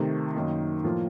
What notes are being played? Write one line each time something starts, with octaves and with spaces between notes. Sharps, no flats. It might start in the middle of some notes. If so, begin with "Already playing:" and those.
Already playing: C3 D#3 A3
F#2 D#3 A#3 D#4
A2 F3 A#3 F4